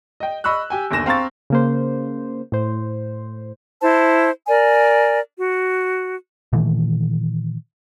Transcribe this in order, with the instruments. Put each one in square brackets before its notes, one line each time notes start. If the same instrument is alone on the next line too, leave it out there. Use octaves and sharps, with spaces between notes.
[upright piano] D#5 G5
D#5 B5 C#6 E6 F#6
G4 G5 G#5
G1 D#2 G#5 A#6 E7
C4 F5 A#5 C#6 A6
[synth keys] C#3 A#3 C5
A2 C5
[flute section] E4 C5 A5
A#4 D5 G#5
F#4
[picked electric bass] A#2 D#3 E3 A3